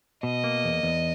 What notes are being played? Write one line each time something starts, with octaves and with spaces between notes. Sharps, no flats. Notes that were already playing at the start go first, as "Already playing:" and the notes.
B2 D#5
A#3
E2
E2